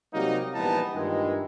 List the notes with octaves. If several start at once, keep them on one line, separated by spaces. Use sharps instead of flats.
C3 F#3 G3 A#3 D#4
A#1 E3 G3 B3 D#4 A5
G2 A#2 D#3 E3 G#3